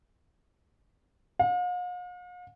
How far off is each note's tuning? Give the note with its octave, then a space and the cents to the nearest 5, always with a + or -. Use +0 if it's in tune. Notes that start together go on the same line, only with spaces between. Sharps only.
F5 +45